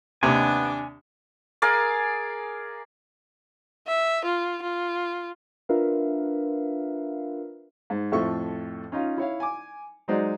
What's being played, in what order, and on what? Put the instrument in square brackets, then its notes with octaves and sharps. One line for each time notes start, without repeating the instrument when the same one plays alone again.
[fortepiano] D#2 C3 [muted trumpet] B3 [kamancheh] D4 D6 [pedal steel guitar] G#5
[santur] G#4 A#4 D5 F5
[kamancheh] E5
F4
F4
[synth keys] D4 F4 A#4 B4 E5 F5
[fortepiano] G#2
F2 A2 F3 A4 E5 C#6
C#4 D#4 F4
E4 C#5 F5
G#5 D6
F#3 G#3 D#4 C5 D5